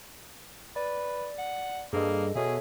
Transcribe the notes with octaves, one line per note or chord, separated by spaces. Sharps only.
B4 D5
F#5
G2 A#3 G#4 A4 D#5
B2 G#4 A4 C#5 E5